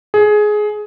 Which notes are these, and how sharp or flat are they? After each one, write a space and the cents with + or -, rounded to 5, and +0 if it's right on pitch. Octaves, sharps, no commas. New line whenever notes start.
G#4 +15